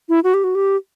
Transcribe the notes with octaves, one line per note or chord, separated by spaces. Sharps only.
E4
F#4
G4
F#4
G4